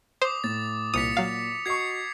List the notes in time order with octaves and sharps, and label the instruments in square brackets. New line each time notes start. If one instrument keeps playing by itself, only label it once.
[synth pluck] C5 [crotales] D6 D#6
[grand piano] A2 [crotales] A6
[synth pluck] C2 D#6 [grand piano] A#2 [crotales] B6 C#7 F7
[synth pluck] F#3 F5
[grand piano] F#4 D#5 C#6 [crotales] G#6 C7 C#7